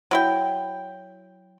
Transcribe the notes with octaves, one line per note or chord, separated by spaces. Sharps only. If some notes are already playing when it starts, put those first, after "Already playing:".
F#3 E4 G5